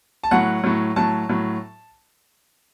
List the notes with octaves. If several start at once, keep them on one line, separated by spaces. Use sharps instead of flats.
A5
A2 F#3 F#5
A2 F#3
A2 F#3 A5
A2 F#3